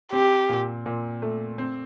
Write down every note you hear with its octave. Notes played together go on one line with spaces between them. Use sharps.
C4 G4
A#2
A#2
A3
C4